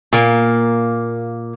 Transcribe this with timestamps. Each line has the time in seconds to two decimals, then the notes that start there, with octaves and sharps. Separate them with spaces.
0.13 A#2 A#3